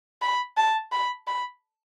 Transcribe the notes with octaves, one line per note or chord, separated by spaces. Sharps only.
B5
A5
B5
B5